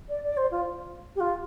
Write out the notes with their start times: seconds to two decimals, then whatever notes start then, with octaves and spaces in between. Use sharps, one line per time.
0.09 D5
0.24 D5
0.37 C5
0.51 F4
1.15 G4
1.20 F4